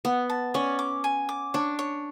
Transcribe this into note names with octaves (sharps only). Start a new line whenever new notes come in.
B3 F#5
A5
C#4 D5
D6
G#5
D6
D4 C#5
C#5